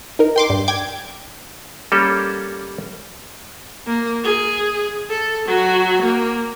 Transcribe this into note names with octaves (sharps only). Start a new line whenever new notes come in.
D#4 A#4
G5 C6 D6
G2
G5 D6 G#6
G3 A#3 C#4 A4
A#3
G#4
A4
F#3 F#4
A#3